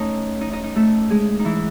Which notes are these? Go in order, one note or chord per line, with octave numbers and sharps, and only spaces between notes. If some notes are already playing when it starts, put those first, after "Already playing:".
Already playing: A3 C#4 D#4 A4 C#5 D#5
D#4 D#5
D#4 D#5
D#4 D#5
A3 A4
G#3 G#4
D#4
E3 E4